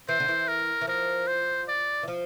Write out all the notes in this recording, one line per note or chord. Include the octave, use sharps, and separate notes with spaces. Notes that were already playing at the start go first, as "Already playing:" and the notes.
E3 C5
D3
E3
A#4
E3
F3 A#4
C5
D5
E3
F3